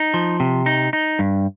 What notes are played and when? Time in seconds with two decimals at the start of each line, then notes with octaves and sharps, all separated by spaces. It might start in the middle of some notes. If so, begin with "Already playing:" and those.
Already playing: D#4
0.14 F3
0.40 C3
0.66 D#4
0.93 D#4
1.19 G2